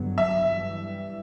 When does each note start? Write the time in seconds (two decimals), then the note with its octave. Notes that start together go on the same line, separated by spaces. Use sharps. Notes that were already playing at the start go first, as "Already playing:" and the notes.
Already playing: G1 G2 F#3 B3
0.18 E5
0.50 G2 E3 G3